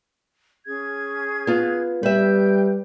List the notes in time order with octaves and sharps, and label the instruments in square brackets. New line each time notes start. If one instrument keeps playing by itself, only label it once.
[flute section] C#4 G#4 G#6
[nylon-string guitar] B3 F4
[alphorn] G3 [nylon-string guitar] B4 E5 [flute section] G5 G6